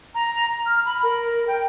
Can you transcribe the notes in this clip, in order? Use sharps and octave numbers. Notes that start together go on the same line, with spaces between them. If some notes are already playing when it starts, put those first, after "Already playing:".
A#5
F6
B5
A#4
G5